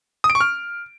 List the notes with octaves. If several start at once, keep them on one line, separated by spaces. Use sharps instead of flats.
D#6
D7
C#6
F6